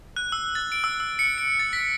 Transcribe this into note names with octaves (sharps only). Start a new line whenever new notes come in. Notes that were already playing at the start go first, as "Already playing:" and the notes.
F#6
E6
A6
D7
E6
E6
C#7
D7
A6
B6